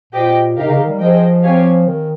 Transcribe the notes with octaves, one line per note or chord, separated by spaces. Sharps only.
A#2 G4 C5 D#5 G5
C3 D#4 G4 A#4 F5
C#3
D#3
G3
F3 G#4 C5 D#5 G5
C4 G4 C#5 F5 G#5
D#3